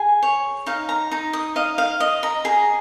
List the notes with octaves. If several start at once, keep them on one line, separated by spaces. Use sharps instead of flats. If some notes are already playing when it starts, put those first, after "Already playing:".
Already playing: G#4 G#5
C#5
D#4 F5
A#5
D#4 A#5
D#6
D#5 F5
F5
D#5
A#5
G#4 A#5